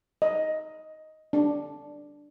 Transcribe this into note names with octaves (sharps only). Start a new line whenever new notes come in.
D#5
D4